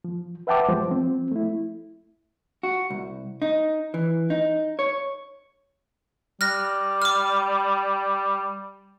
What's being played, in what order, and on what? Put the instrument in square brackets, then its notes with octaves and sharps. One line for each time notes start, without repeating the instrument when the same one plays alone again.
[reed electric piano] F3
B4 E5 F#5 G5 A5 D6
F3 G3 G#3 C5
F3 C4
A3 E4
[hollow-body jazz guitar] F#4
C2
D#4
E3
D#4
C#5
[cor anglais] G3 [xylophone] F6 F#6 A#6
[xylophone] D6 F6